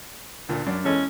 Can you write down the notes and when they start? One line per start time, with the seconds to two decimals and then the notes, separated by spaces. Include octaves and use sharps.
0.49 D2 A#2
0.66 F#2 D4
0.85 E2 G#3 C#4 A4